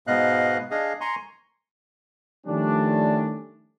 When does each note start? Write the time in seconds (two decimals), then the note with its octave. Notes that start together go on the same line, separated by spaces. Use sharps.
0.07 G#2 B2 B3 D#5 F5 F#6
0.71 D4 G#4 D#5 F5
1.01 G#5 A#5 C6 C#6
2.47 D#3 F3 G3 A3 C#4 D4